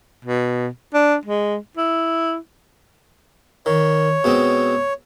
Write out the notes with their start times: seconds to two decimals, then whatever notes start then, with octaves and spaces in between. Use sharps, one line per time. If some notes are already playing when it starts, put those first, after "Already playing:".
0.25 B2
0.94 D4
1.25 G#3
1.77 E4
3.66 D#3 C#5
4.24 B2 G#3 C4